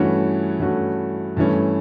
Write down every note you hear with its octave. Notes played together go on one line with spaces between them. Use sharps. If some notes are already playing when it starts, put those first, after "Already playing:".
Already playing: G2 E3 A3 C#4 F#4
G2 E3 A3 C#4 F#4
G2 E3 A3 C#4